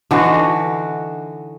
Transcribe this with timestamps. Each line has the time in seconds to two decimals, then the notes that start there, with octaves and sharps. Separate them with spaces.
0.11 D3 E3 D#4 F#4